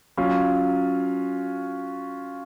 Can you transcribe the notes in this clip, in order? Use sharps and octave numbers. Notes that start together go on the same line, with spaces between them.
F#3 C#4 F4